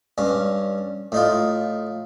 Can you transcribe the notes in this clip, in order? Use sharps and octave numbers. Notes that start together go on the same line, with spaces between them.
G2 C#4
A2 D#4 F4